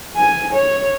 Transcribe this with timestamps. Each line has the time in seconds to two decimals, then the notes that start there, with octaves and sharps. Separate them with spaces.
0.16 G#5
0.53 C#5